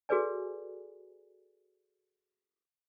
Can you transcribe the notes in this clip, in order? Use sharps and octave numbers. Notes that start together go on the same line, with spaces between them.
F#4 G#4 A4 B4 D5 G#5